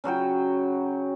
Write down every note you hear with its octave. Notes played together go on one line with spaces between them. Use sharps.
C#3 F#3 F#4 G5